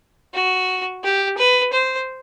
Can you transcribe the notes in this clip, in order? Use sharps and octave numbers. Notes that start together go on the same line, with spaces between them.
F#4
G4
B4
C5